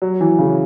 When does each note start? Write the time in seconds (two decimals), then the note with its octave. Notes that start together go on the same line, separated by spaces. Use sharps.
0.02 F#3
0.21 E3
0.38 C#3